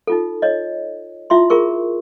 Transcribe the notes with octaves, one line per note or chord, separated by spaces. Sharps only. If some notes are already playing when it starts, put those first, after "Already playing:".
D#4 F4 A4
C#5 D#5
E4 F4 E5 C6
F4 G#4 A#4 C#6